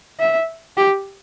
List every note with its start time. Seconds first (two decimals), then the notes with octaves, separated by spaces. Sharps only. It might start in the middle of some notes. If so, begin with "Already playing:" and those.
0.19 E5
0.77 G4